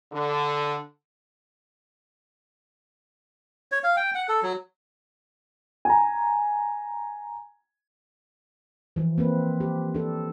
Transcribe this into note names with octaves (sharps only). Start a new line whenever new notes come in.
D3
C#5
F5
G5
F#5
A4
F#3
G#5 A#5
E3 F3
A#3 C4 B4
G4
D4 A4